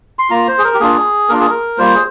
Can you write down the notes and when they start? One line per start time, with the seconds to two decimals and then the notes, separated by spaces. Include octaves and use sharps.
0.19 C6
0.30 A#3 F4 A#5
0.48 C5
0.58 G#4
0.64 A#4
0.74 G4
0.80 A#3 D4 F4 G#4
1.29 A#3 D4 F4 A#4
1.40 G#4
1.50 A#4
1.78 G3 A#3 F4 C5
1.95 G#4